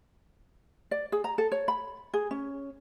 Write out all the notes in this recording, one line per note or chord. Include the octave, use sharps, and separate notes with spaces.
D5
G#4
A#5
A4
C#5
B5
G#4
C#4